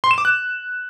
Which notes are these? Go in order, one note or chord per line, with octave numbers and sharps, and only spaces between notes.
C6
E7
D6
F#6